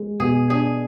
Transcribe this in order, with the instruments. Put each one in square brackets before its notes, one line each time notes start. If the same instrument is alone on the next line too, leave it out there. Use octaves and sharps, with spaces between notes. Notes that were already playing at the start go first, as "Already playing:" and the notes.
Already playing: [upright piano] G#3
[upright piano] B2 [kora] G#4
[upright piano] D4 [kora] G#4